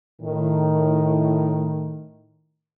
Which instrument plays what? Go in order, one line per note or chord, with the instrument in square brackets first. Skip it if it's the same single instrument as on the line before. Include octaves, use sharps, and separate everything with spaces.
[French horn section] A2 D#3